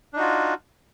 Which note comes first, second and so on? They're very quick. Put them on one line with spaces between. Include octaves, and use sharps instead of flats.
D4 D#4 F#4 F4